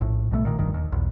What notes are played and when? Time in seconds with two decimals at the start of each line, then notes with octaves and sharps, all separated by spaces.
0.01 A#1 A2
0.31 B1 B2 F3 A3
0.45 A#2 D#3
0.58 F1 G2 D#3
0.74 D#2
0.92 B1 E2